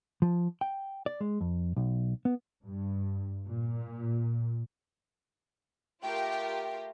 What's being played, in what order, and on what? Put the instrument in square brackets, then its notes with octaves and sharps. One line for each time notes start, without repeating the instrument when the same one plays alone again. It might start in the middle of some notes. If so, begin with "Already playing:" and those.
[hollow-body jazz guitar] F3
G5
D5
G#3
F2
B1
B3
[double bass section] G2
A#2
[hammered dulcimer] A3 [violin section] F4 G4 A#4 [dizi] G5